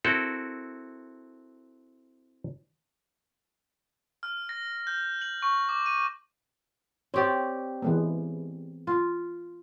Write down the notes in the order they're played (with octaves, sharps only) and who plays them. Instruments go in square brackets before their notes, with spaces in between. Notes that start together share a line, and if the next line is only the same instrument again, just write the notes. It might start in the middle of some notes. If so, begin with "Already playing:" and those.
[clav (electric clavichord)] C4 E4 F#4 A4 A#4
[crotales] F6
A#6
G6
F#7
C#6
D6
D#7
[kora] C4 G4 D5 [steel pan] C#5
[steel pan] E3 G#3 B3
[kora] F4